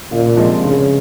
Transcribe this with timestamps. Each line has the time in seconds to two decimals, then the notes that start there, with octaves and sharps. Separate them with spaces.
0.11 C#2 A#2
0.37 C3 F3 G#3 C4
0.63 G2 C#3